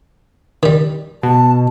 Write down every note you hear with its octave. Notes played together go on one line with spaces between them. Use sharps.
D#3 G3
B2 A5